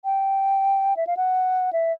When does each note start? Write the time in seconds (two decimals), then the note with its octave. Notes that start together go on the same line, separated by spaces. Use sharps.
0.05 G5
0.97 E5
1.07 F5
1.17 F#5
1.73 E5